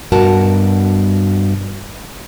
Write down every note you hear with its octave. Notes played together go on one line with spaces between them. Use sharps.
G2 B2 F#4 A#4 A5